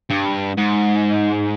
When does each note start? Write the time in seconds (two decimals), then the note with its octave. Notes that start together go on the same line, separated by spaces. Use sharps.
0.10 G2
0.58 G#2